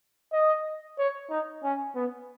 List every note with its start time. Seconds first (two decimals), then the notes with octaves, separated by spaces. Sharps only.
0.32 D#5
0.99 C#5
1.30 D#4
1.64 C#4
1.95 B3